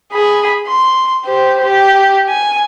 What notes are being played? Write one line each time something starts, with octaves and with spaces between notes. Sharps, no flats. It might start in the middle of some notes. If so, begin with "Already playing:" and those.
G#4 B5
C6
G4 C5
G4
G#5